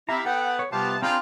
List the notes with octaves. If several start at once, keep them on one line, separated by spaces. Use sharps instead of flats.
C4 E4 G4 E5 F5 A#5
B3 A4 B4 F#5 G5
C#5
C3 G3 B3 F4 G4 C5 F5 A5
C4 D4 F4 G#4 F5 G5 A#5 B5